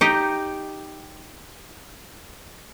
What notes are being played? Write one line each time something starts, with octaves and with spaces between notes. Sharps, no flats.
D#4 G4 D#5